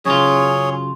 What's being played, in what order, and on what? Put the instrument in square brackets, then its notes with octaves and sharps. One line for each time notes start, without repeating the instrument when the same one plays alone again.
[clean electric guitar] F#2 C#3 F4 [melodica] G#4 C#5